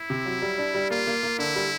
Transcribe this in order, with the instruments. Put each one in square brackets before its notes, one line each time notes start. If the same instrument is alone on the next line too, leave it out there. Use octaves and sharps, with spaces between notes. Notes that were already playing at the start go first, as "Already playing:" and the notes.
Already playing: [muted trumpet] E4
[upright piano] C3
F#3
G3
D4
G3
[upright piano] A#3 [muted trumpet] F4
[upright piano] A#3
A#3
[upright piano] D3 [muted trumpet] E4
[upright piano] G3